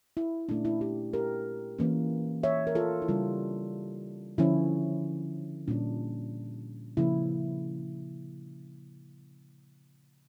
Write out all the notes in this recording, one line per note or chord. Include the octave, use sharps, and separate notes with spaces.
E4
A#2 A3 C#4 D4
E4
E4 G4
G4 A#4
E3 A#3 C#4
C#5 E5
A#4
F4 A4
E4
C#3 G3 C#4 D4 F4
D3 F3 C#4 E4
A#2 G3 C#4 D4
C#3 F3 A#3 E4